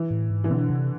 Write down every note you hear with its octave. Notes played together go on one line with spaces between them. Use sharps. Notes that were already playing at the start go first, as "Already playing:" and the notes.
Already playing: E3
A2
G#2
E3
B2 D3
C3